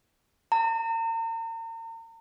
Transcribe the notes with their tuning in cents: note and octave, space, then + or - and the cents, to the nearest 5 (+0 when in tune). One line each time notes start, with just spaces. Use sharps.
A#5 -40